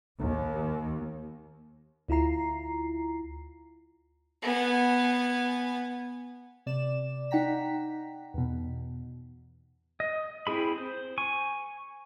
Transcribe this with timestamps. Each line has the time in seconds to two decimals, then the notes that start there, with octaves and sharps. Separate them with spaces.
0.21 D#2
2.08 D2 E4 F4 A#5 C7
4.42 B3 G#5
6.66 C3 D5 E7
7.31 D#4 F#5 G5 A#5 B6
8.34 E2 B2
10.00 D#5
10.47 C4 E4 G#4 B5
10.78 C5
11.18 G#5 C#6